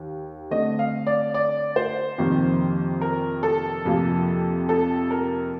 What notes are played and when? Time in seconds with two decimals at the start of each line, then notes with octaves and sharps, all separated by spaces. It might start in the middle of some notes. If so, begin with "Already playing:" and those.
Already playing: D#2
0.51 D3 A3 C4 D#5
0.79 F5
1.07 D5
1.34 D5
1.76 C5
2.18 F2 C3 D#3 A#3
3.01 A#4
3.43 A4
3.85 F2 C3 F3 A#3 F4
4.69 A4
5.11 A#4